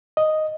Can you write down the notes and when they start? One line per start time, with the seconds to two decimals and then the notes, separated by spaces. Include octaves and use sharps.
0.17 D#5